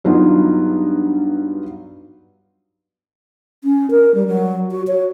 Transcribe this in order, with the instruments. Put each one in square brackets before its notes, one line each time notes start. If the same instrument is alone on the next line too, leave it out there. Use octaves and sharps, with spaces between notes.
[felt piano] G2 F#3 B3 D#4 F4
[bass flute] C#4
A#4
G3
F#3
F#4
C#5